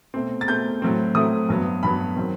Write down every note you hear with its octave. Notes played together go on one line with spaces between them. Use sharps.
B2 A3 C4
A6
B2 A3 C4 G6
A2 F#3 A3 C4
A2 F#3 A3 C4 D#6
G2 F#3 B3
G2 F#3 B3 B5
D#3 F#3 C4